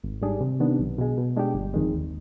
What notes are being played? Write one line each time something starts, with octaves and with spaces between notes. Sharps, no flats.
G#1
G#2 G3 D4 G#4
C3
D#3 B3 D4
B1
B2 G#3
B2
G#3 D4 G4
G1
F2 D#3 G#3
D#2